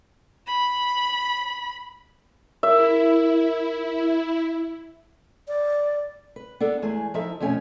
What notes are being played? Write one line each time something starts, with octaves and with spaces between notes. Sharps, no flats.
B5
E4 A#4 E5
D5
B4
B3 D4 A4
E2 G#3 A3 G#4 G#5
F3 D#4 E4 A4 E5
F2 B2 A3 C#4 G#5